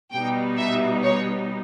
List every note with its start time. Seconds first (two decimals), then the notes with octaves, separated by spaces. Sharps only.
0.12 B2 G3 B3 D#4 G5
0.58 E5
1.04 C#5